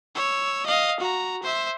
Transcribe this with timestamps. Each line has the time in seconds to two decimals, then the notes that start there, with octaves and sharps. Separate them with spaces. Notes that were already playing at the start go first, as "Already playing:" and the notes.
0.15 C#5 E6
0.66 D#5 F5
1.00 F#4 A#5
1.43 C5 E5